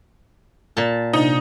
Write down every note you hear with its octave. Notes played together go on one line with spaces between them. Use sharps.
A#2 A5
C3 D4 D#4